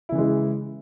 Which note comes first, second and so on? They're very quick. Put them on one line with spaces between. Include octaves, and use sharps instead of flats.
E4 C#3 E3 G#3